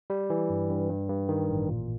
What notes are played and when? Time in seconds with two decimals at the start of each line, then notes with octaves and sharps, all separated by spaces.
0.10 G3
0.30 E3
0.50 G2
0.70 G2
0.89 G2
1.09 G2
1.29 D#3
1.49 A1
1.69 A#2